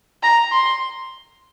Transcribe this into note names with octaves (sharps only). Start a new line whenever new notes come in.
A#5
C6